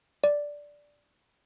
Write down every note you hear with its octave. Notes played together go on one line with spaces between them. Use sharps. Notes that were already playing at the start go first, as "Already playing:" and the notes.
D5